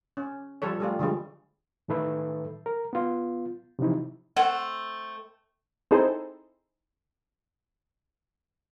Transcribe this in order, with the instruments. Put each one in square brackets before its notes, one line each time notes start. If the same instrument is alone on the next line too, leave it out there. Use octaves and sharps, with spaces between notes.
[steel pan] C#4
F3 G3 A4 C#5
G3 A3 F4
D3 F3 G3 G#3
[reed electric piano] A2 D#3 A4 B4 E5
A#4
B3 F4
C3 E3 F3 D#4 E4
[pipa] A3 C4 F#5
[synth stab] C4 D#4 E4 G#4 A4 C5